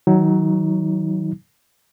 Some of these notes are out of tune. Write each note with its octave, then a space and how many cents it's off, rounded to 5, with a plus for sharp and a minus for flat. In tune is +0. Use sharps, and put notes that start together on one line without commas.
D#3 +35 F#3 +15 D#4 +35